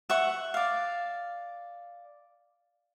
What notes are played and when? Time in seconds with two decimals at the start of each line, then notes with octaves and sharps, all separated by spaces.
0.10 E5 F#5 C#6
0.54 D5 F5